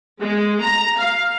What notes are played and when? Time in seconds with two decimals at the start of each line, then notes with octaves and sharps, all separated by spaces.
0.21 G#3
0.62 A#5
0.99 F5